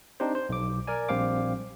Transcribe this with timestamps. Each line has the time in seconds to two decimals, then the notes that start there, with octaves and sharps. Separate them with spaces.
0.20 C4 D4 D#4 G4 C5
0.35 C5
0.49 B1 D6
0.87 A#4 D5 G#5
1.09 A#1 G3 C4 C5 F5 D6